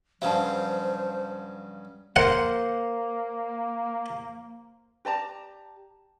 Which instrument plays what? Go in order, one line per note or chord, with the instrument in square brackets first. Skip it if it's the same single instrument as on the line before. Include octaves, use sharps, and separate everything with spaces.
[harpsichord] G2 C#3 F#3 [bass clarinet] F3 [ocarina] C5 [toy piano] F5 A5
[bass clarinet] A#3 [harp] A#4 C5 [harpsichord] F#5
[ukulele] G4 D5 A5 A#5